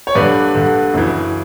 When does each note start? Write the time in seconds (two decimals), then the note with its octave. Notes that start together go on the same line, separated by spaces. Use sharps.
0.07 C#5
0.15 G2 D3 B4 D5
0.54 G2 D3
0.94 F#2 C#3 E3